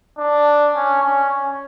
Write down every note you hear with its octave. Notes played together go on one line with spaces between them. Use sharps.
D4
C#4
C#4